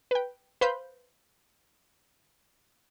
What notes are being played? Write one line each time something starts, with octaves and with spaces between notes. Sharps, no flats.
B4 G5
B4 C5 F5 B5 C6 G6